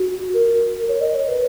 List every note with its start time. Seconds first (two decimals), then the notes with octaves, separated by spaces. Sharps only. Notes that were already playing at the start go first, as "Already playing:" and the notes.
Already playing: F#4
0.34 A#4
0.88 C#5
1.01 D#5
1.15 C#5
1.28 B4